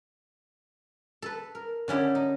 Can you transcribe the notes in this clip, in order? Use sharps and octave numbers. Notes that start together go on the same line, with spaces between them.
A4 B4
A#4
D3 C#4 E4 G4
D#4